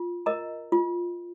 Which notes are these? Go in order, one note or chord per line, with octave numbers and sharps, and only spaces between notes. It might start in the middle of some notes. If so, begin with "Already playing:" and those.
Already playing: F4
A#4 D#5 A#5
F4